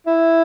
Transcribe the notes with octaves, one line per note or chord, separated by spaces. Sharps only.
E4